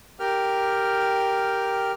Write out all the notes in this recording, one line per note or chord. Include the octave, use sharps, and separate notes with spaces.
G4 A#4 G5 F6